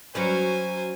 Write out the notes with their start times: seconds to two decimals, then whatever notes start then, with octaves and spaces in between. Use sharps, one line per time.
0.15 F#3 C#4 B4 C5 G#5